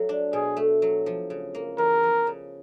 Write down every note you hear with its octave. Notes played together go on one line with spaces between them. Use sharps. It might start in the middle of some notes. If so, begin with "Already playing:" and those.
Already playing: F#3 A3
D4
B2 G#4
A3
F#3
F3
C#3
A#3
E2 A#4
F3
C#3